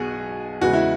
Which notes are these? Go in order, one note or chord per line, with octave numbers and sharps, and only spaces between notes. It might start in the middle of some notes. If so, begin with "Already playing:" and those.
Already playing: B1 B2 B3 F#4 G#4
E2 C#3 G#3 F#4
E4